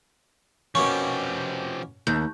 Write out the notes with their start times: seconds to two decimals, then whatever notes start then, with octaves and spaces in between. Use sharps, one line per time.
0.75 B2 F3 A#3 C#4 G4 C#6
2.07 D#2 G6